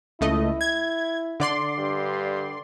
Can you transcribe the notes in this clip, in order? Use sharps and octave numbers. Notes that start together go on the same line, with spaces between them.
C#2 A3 E4 D#5
G#6
D3 D5 C6
G2